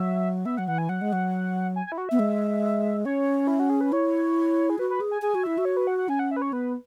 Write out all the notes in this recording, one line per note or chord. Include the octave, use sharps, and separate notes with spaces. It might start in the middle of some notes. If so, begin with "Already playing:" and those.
Already playing: F#3 E5
B3 E5
F#3 F#5
E3 F#5
G#5
F#3 F#5
G#3
F#3
G#5
G#5
E4
F#4
B3 E5
G#3
C#4 C#5
E4
F#4
G#4
B4
E4 C#5
G#4
F#4 B4
B4
G#4
G#5
G#4 G#5
F#4
E4 E5
F#4
C#5
B4
F#5
F#5
C#4 G#5
F#5
E5
B4
C#5
B3 B4